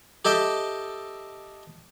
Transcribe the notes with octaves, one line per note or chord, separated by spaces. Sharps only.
G4 A4 D#5 E5 G5